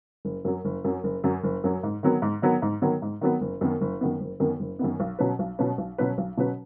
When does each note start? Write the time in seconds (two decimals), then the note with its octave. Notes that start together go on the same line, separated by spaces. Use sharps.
0.25 F#1
0.45 F#2 F#3
0.65 F#1
0.84 F#2 F#3
1.04 F#1
1.24 F#2 F#3
1.44 F#1
1.64 F#2 F#3
1.83 G#2
2.03 D#3 F#3 B3
2.22 G#2
2.42 D#3 F#3 B3
2.62 G#2
2.82 D#3 F#3 B3
3.02 G#2
3.21 D#3 F#3 B3
3.41 F#1
3.61 F#2 D#3 B3
3.81 F#1
4.01 F#2 D#3 B3
4.20 F#1
4.40 F#2 D#3 B3
4.60 F#1
4.79 F#2 D#3 B3
5.00 B1
5.19 B2 F#3 C#4 B4
5.39 B1
5.59 B2 F#3 C#4 B4
5.78 B1
5.98 B2 F#3 C#4 B4
6.18 B1
6.37 B2 F#3 C#4 B4